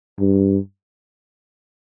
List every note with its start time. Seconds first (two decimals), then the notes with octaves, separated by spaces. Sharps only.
0.20 G2